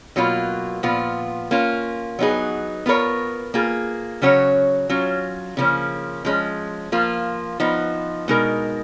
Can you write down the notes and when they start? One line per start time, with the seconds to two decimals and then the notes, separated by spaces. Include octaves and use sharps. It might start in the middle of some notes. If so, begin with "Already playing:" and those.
0.16 B2 F#3 A#3 F4
0.83 A#2 F3 B3 F4
1.51 A#3 C#4 F4
2.19 F#3 B3 D#4 G#4
2.86 B3 F4 A#4 C#5
3.54 A#3 F4 G#4
4.22 C#3 F#3 C#4 F#4 C#5
4.89 F#3 C#4 F4
5.57 C#3 F3 A#3 C#4
6.25 F3 G#3 C#4
6.92 F3 A#3 F4
7.60 F3 B3 D#4
8.28 B2 G#3 D#4 A#4